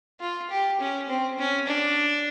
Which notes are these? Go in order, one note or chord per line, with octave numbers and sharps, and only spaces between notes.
F4
G4
C#4
C4
C#4
D4